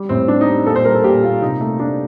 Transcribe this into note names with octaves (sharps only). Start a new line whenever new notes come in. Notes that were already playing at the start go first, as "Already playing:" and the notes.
Already playing: G3
A2 C4
G3 D4
D#4
G3
A#2 A4
C5
G3 A#4
A4
A#2 G4
A#3 F4
C3 D#4
A3
A3 D4